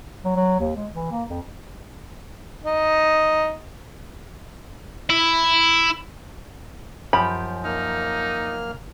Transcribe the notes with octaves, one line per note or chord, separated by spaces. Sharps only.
F#3
F#3
D#2
G#3
E3
A#3
F2
D#4
E4
F#2 F3 G4 B5
A#3 D#4 F6